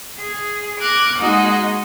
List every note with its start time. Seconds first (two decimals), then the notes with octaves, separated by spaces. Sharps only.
0.18 G#4
0.78 D6 F6 F#6 G#6 A#6
1.16 G#3 A#3 D#4 F#4 G#4 D#5